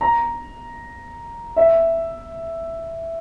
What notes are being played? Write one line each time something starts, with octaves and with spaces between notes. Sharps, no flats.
A#5
E5